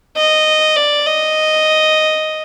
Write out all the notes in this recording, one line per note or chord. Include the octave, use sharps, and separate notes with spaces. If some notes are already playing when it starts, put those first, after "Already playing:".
D#5
D5
D#5